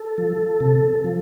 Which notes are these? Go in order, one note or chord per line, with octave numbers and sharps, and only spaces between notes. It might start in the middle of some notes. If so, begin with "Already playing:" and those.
Already playing: A4
F3
C3
F3